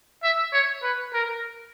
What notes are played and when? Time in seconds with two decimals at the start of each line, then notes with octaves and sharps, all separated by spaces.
0.23 E5
0.53 C#5
0.83 B4
1.14 A#4